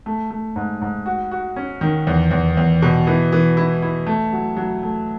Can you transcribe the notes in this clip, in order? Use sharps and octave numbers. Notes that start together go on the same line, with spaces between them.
A3
A3
G#2
G#2
F#4
F#4
C#4
D#3
E2
E2
E2
B2
E3
E3
E4
E4
A3
F#3
F#3
A3